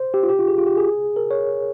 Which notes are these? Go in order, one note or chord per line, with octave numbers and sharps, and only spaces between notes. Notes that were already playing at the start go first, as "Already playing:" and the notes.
Already playing: C5
G4
F4
G4
F4
G#4
F4
G4
G#4
A#4
C#5